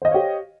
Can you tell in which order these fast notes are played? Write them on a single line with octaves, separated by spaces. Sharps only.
C5 D#5 F5 C#5 G4